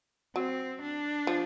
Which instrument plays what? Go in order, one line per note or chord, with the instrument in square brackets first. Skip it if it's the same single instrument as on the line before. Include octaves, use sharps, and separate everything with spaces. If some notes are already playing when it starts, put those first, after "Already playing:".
[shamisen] F#3 [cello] C4
[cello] D4
[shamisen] F3